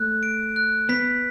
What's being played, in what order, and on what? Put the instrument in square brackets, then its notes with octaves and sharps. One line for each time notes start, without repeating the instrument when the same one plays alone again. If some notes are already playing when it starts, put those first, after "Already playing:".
Already playing: [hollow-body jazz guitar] A3 [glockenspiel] F#6
[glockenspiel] D7
F#6
[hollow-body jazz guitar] B3 [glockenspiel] B6